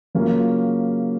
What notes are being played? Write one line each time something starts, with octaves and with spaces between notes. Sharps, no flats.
C#3 F#3 A#3 C#4 F4